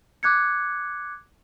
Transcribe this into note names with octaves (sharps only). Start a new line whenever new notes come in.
D6 F#6 G#6 C#7